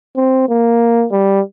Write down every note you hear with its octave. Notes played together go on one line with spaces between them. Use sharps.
C4
A#3
G3